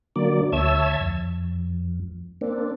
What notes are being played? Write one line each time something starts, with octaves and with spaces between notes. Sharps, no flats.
D3 F#3 A#3 D5
D2 C#5 E5 A5 E6 G#6
F2
A#3 C4 D4